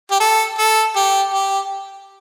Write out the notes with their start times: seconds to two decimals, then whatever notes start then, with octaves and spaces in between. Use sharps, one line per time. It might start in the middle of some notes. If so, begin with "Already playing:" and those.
0.11 G4
0.20 A4
0.58 A4
0.96 G4
1.33 G4